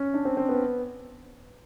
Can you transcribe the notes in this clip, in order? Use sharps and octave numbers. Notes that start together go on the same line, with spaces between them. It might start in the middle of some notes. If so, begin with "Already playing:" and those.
Already playing: C#4
D4
C4
C4
B3